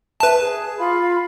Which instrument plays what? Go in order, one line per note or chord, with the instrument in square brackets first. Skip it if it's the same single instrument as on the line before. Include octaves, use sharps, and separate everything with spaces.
[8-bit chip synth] B4 A5 [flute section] E5
[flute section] G#4
F4 F5 B5